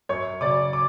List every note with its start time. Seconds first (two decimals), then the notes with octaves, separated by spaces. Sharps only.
0.09 F#2 C#5 C#6
0.41 C#3 F#3 D5 D6
0.73 D6